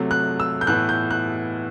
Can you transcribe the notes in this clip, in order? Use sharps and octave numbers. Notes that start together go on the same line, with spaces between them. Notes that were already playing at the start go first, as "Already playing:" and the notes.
Already playing: C3 F#3 A3
F#6
E6
G6
A2 E3 B3 F#6
G6
F#6